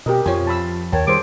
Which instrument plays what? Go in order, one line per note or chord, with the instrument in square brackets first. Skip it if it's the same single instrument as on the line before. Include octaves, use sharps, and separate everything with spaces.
[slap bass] B2 [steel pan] G4 A#4 D#5
[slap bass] F2 F3 [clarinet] F4 [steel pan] C#5 G#5
[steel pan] A5 B5 E6
[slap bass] D#2 [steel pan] A#4 G5 A5 [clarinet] C#5
[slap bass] D#3 G3 [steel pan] G#4 C5 [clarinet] D6